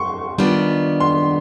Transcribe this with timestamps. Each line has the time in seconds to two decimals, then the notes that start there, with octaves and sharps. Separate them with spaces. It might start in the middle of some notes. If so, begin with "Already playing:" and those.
Already playing: C6 C#6
0.38 D#3 G3 B3 D4 F4
1.00 C6